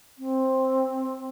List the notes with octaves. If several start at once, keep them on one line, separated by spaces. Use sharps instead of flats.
C4